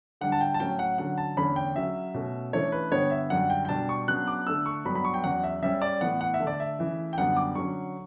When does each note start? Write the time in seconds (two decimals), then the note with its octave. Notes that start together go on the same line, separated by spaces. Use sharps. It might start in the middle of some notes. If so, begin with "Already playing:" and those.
0.21 D3 G3 D4 F#5
0.32 A5
0.41 G5
0.54 A5
0.60 A2 F#3 A3 C#4 G5
0.79 F#5
0.98 D3 F#3 C#4 F#5
1.18 A5
1.37 E2 D3 A3 C#4 B5
1.56 G5
1.76 C#3 F#3 C#4 E5
2.14 B2 A3 C#4
2.53 C#3 E3 A3 D4 C#5
2.72 B4
2.91 G2 D3 G3 B3 C#5
3.11 E5
3.30 F#2 D3 G3 F#5
3.50 G5
3.65 G5
3.69 B2 G3 D4 A5
3.89 C#6
4.08 C#3 F#3 B3 D4 F#6
4.28 D6
4.47 D3 A3 D4 E6
4.66 C#6
4.85 G2 F#3 B3 B5
4.95 B5
5.05 C#6
5.14 G5
5.24 E2 C#3 F#3 F#5
5.44 E5
5.62 C#3 G3 C#4 E5
5.82 D5
6.01 A2 E3 B3 F#5
6.21 F#5
6.34 E5
6.40 D3 A3 D4
6.47 D5
6.60 E5
6.79 C#3 E3 A3
7.13 G5
7.18 F#2 D3 G3 B3 D4 F#5
7.37 D6
7.55 D3 F#3 C#4 C#6